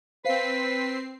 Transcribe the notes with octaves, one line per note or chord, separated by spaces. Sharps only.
C4 B4 C5 F5 C7